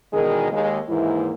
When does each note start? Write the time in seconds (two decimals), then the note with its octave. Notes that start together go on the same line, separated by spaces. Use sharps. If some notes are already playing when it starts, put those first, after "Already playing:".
0.13 E2 B2 D#3 G#3 G#4 A#4
0.52 D#2 G#3 A#3
0.88 D#2 G#2 E3 A#3 E4